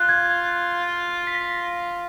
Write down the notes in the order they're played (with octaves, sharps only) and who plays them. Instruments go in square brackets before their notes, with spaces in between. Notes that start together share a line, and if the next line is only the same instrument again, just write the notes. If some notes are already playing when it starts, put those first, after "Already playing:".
Already playing: [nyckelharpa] F4 [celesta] F#6
[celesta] G#6
B6
A#6